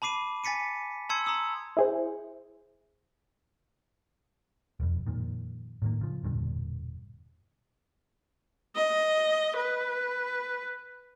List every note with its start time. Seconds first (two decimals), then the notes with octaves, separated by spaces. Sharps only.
0.02 A5 B5 D6 C7 D#7
0.44 G#5 A6 B6 C#7 D#7
1.09 A5 A#5 C6 E6 G#6 C#7
1.26 A#5 C6 D#6 E6
1.77 E4 G#4 C5
4.80 E1 F2
5.07 F2 A#2 D#3
5.82 A2 D#3 A#3
6.01 C#3 F3
6.24 E1 G2 A#2 D3
8.76 D#5
9.56 B4